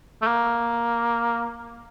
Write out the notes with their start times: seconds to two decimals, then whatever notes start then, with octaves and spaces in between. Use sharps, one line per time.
0.22 A3
0.27 A#3